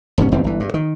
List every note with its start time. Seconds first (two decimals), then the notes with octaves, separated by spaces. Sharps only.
0.18 E1 G#2 C3 C#4
0.32 E1 D#2 E3 C4
0.44 G1 E3
0.60 G2
0.74 D#3